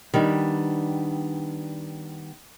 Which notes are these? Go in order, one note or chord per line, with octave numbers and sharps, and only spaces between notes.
D#3 G3 B3 D4